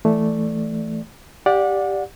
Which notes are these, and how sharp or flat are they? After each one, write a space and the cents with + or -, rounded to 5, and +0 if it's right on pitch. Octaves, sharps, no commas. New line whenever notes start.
E3 +0 A3 +0 D5 +0
G4 +0 D5 +0 F#5 -35